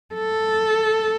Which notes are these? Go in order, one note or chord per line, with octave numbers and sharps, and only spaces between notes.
A4